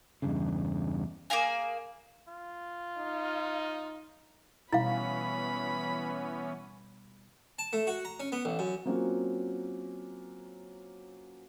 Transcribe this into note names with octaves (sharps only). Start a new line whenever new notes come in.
E2 G2 C#3
A#3 G#4 F5 G#5
F4
D#4
B2 E3 G3 B3 C#4 E4 F5 B5
A5
A3
F#4
A#5
C#4
B3
A1
F#2
F#3 A#3 C4 C#4 F4 F#4